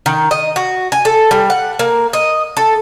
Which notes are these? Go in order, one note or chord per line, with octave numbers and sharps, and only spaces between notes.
D#3
D#5
F#4
G#5
A4
G3
F#5
A#3
D#5
A4